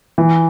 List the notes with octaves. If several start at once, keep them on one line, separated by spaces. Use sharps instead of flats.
E3